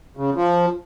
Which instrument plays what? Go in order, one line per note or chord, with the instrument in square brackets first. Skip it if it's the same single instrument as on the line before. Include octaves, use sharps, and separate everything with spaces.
[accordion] C#3
F3